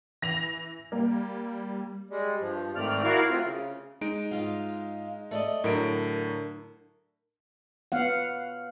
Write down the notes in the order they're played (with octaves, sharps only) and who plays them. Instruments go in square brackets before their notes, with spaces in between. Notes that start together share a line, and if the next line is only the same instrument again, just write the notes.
[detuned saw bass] E3 [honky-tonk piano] A#6 F7
[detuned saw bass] G3 [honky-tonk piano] A#3
[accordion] G3 G#3
G2 F3
G#2 D#3 A3 C4 D5 F6
E4 F#4 A#4 D5 F5
F#3 A3 C4 F4
C#3
[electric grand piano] G#3 D#4 D7
[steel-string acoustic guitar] G#2 F4 F5
A3 D5 D#5
[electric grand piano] A2 F#3 D7 [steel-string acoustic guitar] D3 A#4
[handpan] B3 F5 F#5